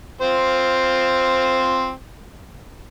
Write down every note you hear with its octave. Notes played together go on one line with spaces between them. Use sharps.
C4 F4 C5